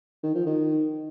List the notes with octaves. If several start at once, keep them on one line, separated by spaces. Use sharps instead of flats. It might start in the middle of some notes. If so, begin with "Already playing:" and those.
D#3
F3
D#3